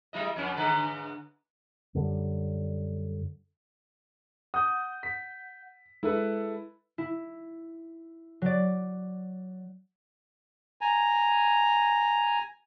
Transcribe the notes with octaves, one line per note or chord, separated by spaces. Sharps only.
F#3 E4 D#5
F2 C#4
G#2 D3 B4
F#2 D3 G3
F#5 D#6 G6
B6
G#3 E4 A4 B4
E4
F#3 D5
G#5 A#5